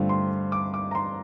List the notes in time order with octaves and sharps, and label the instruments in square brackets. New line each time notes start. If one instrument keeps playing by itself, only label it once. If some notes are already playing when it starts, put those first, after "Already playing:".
Already playing: [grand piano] G2 D3 A3 C4 F4
C6
D6
D6
A#5
C6